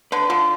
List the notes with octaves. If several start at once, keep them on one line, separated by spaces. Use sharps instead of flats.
D3 B4
D3 F4